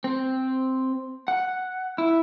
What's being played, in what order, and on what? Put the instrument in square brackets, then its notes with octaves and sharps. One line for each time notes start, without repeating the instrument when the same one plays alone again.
[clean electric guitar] C4
F#5
E4